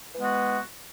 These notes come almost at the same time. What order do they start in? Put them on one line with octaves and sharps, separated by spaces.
E3 G#3 B3 F#4